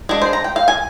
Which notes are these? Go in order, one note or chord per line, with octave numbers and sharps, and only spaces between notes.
G#3 D4 G#4
C5
A#5
G5
F5
G#5